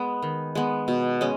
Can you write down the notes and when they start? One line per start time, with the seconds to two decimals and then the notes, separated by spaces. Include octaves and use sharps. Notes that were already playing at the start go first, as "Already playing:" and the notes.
Already playing: G#3 B3
0.22 D#3
0.55 G#3 B3
0.88 B2
1.21 G#3 C#4